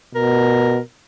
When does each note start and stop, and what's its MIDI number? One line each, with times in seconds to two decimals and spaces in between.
0.15 0.79 47
0.15 0.80 70